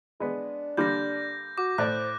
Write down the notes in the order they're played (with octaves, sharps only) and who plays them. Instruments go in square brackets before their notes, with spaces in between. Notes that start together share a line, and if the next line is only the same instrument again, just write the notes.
[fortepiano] G#3 B3 [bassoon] D4
[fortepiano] D3 G3 A#3 [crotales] G6 A#6
[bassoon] F#4 [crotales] D6
[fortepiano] A2 D5 [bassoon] C5 [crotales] F#6